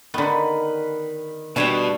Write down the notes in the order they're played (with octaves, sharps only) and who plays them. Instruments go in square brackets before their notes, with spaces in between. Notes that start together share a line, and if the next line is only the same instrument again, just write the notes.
[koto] D3 B3 [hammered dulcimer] D#3 B4
[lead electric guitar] B2 [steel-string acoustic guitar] G3 D4 [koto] A3 C#5 G5